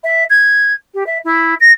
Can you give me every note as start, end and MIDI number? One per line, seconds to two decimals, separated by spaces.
0.04 0.24 76
0.30 0.73 92
0.94 1.04 67
1.06 1.18 76
1.25 1.54 64
1.60 1.72 94